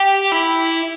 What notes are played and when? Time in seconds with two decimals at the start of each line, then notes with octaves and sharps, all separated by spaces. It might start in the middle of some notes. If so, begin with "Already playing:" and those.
Already playing: G4
0.32 E4